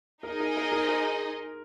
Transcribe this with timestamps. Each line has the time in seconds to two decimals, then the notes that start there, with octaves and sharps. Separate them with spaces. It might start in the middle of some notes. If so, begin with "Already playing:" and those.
0.23 D#4 G#4 A#4 D#5
0.40 A#4
0.57 A#4
0.72 A#4
0.82 C5
0.89 A#4